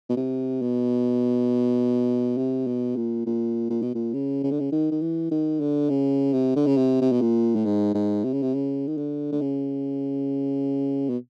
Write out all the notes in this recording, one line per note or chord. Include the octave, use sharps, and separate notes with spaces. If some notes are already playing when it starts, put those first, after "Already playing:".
B2
C3
B2
C3
B2
A#2
A#2
A#2
B2
A#2
C#3
C#3
D3
C#3
D#3
D#3
E3
D#3
D3
C#3
C3
D3
C#3
C3
C3
B2
A#2
A2
G#2
G#2
C3
C#3
C3
C#3
D#3
D3
D3
C#3
B2